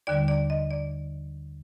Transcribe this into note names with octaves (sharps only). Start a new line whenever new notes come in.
D#2 D3 G3 D5
D5
D#5
D5